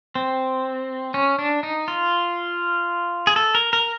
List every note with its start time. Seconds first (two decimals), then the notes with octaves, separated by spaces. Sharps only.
0.15 C4
1.14 C#4
1.39 D4
1.63 D#4
1.88 F4
3.27 G#4
3.36 A4
3.55 A#4
3.73 A#4